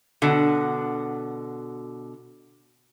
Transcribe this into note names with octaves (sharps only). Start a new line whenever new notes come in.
B2 D3